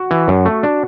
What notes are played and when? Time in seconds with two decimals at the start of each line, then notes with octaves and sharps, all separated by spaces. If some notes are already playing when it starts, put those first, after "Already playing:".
Already playing: F#4
0.11 E3
0.28 F#2
0.45 A3
0.63 D4